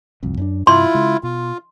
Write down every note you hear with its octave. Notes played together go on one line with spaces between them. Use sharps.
G1 C2 F2
F#2 C#4 D4
G2 C3 E4 F4 C6
C#3 G#3
B2 F4